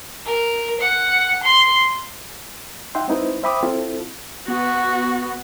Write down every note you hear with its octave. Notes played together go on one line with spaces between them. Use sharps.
A#4
F#5
C6
D#4 E5 F#5 G5 C6
G#3 C4 D#4 E4 B4 C5
C5 E5 G5 B5 D6 D#6
C4 E4 F4 A4
B3 F#4